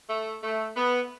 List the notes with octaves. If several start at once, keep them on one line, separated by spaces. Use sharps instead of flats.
A3
A3
B3